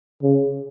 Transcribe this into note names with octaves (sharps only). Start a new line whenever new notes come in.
C#3